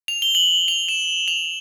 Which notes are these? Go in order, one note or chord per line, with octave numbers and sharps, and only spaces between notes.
F7
G7
F#7
F7
E7
F7